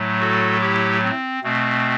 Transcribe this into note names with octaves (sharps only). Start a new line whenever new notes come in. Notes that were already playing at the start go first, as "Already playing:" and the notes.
Already playing: A2 F#3 A3
F#4 A4
E4 G4
C4
B2 A3 C4